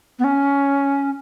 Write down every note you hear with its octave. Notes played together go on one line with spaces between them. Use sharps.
B3
C#4